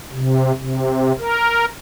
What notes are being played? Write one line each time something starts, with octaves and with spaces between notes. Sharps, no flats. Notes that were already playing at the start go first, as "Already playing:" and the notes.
C3
C3
A#4